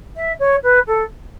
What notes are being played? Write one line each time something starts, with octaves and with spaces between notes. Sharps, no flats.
E5
C#5
B4
A4